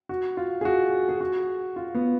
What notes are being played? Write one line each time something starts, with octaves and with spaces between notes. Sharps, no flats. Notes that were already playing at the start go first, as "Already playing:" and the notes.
F#4
F4
G#4
F#4
G#4
F#4
F4
B3